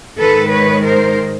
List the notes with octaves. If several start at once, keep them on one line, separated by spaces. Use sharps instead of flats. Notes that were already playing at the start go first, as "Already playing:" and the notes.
G#2 D#3 G#3 A4 B4
B4 C#5
A#4 C5